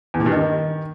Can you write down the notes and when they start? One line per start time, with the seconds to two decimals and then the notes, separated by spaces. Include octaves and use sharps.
0.14 E2
0.20 A#2
0.26 G2
0.32 D#3